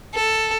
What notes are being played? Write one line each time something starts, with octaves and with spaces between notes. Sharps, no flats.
A4